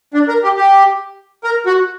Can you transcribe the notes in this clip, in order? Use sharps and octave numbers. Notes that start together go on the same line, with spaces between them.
D4
A#4
G4
G4
A#4
F#4